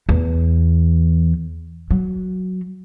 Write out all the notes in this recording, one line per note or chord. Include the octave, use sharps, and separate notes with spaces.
E2
F#3